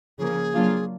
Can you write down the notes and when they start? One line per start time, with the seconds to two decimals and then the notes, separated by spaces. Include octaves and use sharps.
0.18 C#3 F3 A#3 G#4
0.55 F#3 A#3 D4 F4